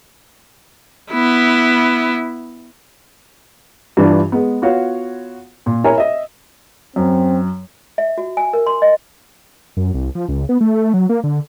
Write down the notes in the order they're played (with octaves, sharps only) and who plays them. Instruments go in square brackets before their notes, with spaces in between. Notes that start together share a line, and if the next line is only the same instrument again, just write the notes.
[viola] B3 E4
[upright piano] G2 E3 D4 F4
G#3 B3
B3 F4 F#4 C#5 F5 F#5
A#2
E4 A#4 C#5 E5 G#5 A#5
D#5 E5
[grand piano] F#2 [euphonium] C4
[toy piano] E5
F#4
G#5
A#4
C6
D#5
[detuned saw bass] F#2
C2
F3
C#2
B3
A3
F#3
A#3
D3